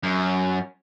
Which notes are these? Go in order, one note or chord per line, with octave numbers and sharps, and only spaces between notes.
F#2